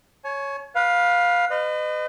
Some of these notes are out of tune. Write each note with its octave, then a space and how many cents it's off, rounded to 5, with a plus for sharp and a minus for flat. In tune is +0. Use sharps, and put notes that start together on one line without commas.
C#5 +0 G#5 +40
B4 -15 F5 +15
B4 +35 D#5 -30